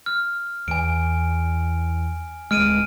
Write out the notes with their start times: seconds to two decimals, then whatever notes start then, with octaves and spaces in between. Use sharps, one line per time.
0.06 F6
0.68 E2 G#5 D7
2.51 D1 G#1 G#3 F6 D7 D#7